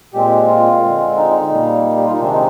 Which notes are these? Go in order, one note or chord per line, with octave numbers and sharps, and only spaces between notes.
A#2 G#3 C4 G4
F4
D3 G#3 C4
D#4
A#2 G3 A#3
G4
F4
D#4
C3 D#3 G#3 C4 D4
D#4